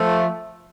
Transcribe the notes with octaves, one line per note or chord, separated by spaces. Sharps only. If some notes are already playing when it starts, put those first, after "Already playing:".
Already playing: F3 A3